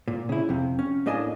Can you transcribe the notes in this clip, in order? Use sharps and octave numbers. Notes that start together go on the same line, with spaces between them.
A#2
C#3 E4
F2 C3
C#4
A2 A#3 D4 D#5 G#5 A5